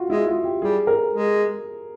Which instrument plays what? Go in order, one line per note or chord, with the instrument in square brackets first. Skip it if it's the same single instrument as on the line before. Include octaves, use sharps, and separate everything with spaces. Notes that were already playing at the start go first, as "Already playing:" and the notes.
Already playing: [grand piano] F4 F#4
[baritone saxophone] G#3 [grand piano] E4
[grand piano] F4
G4
[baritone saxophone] G3 [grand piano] G#4
[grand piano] A#4
[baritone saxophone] G#3